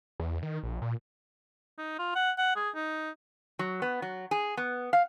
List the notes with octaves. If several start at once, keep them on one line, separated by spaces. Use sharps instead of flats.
E2
D#3
A#1
A#2
D#4
F4
F#5
F#5
G#4
D#4
F#3
B3
F#3
G#4
B3
F5